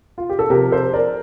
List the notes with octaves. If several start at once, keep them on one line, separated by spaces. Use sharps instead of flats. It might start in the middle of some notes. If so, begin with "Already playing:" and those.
F4
G4
A4
C3 F3 G4 A#4
A4 C5
A#4 D5